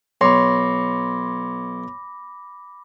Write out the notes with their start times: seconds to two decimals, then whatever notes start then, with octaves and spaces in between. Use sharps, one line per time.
0.21 B1 C#5 B5 C6 D6 A#6